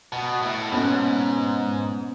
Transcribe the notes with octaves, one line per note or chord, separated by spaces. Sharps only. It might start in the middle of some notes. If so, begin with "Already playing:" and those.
B2
A2
G#2 B3 C#4